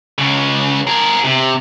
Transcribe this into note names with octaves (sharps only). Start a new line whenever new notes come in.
C#2 C#3
G#4 A#4
C3